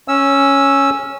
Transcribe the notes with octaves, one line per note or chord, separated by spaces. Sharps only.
C#4 E6